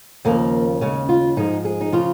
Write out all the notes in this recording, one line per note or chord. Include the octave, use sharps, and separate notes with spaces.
D#2 C#3 F3 A#3
D#2 C#3 G#3 C#4
F4
G#2 F3 G#3 D#4
G#4
D#4
C#3 F3 F4